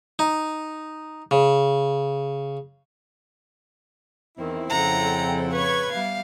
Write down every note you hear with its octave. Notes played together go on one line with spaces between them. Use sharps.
D#4
C#3
E2 D#3 C4 E4
F2 C#3 A4 F#5 G5 A#5
B4 C#5 B5 C#6 G#6
G3 B3 E5 F5